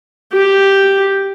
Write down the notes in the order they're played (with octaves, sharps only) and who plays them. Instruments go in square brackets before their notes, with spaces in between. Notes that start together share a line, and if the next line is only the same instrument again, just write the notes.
[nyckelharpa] G4